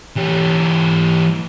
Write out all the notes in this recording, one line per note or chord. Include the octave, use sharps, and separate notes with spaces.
E3 G4